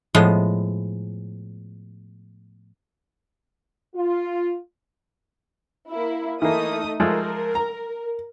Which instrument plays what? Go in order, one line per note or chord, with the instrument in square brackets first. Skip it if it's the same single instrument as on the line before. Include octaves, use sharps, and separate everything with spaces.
[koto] A2 F3 G#3 B3
[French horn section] F4
[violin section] A#3 E4
[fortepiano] E3 A#3 [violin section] A3 D#4 D#6
[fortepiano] F3 G#3 A3 [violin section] A#4
[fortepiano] A#5